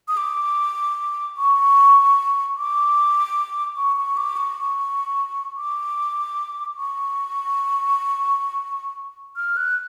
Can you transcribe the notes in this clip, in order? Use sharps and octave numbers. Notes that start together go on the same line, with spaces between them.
D#6
D6
C#6
D6
C#6
C#6
D6
C#6
D6
C#6
F6
F#6